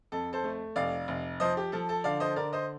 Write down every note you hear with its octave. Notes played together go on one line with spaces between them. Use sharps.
F2 A4
A4 C5
A3
F1 D5 F5
F1
F3 C5 D#5
G4
F3 A4
A4
D3 D5 F5
C5 D#5
D3 A#4 D5
C5 D#5